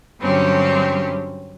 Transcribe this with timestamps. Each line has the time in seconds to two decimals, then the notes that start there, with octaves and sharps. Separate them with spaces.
0.20 G2 D3 F#3 C4 C#4 G4